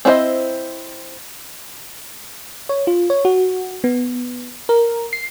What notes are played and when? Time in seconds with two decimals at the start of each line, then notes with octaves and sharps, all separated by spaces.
0.05 C4 D4 E4 C5 D#5
2.69 C#5
2.87 F4
3.10 C#5
3.25 F#4
3.84 B3
4.69 A#4
5.13 C7